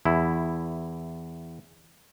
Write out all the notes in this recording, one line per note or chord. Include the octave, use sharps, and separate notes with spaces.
E2 E4